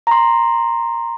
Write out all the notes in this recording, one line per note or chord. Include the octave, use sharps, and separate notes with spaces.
A#5 C6